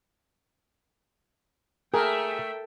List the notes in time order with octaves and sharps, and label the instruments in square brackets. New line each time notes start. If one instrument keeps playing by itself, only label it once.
[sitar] A3 [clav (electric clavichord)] G#4 [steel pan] A#4 [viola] E5 G5